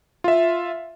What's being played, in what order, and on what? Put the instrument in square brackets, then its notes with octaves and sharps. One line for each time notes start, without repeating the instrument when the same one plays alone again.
[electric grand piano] F4 E5